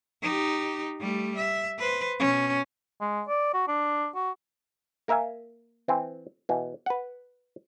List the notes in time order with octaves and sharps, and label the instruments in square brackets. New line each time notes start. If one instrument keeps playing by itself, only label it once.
[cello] D#4 G4
G3 A3
E5
B4 C5
B2 C#4
[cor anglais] G#3
D5
F#4
D4
F#4
[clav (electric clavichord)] A#3 A#4 E5 F5 G#5
E3 C4
B2 E3
B4 F#5